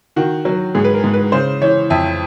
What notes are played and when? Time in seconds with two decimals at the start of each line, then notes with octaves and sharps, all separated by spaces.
0.16 D#3 F#4
0.45 F#3
0.75 G#2 G#4
0.84 B4
0.94 A#4
1.04 G#2
1.13 B4
1.32 C#3 C5
1.61 E3 C#5
1.90 F2 E5